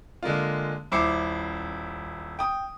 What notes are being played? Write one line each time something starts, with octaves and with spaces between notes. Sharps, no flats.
D3 G#3 A#3 F4
D#1 E4 C5 D6 C7 C#7
G5 D#6